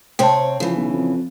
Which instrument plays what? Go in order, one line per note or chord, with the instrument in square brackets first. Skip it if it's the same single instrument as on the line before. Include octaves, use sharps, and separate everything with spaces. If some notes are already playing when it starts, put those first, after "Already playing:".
[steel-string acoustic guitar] C3 C4 C#5 [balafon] G5 A5
[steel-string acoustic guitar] C#3 E3 [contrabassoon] F3
[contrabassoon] B1
F2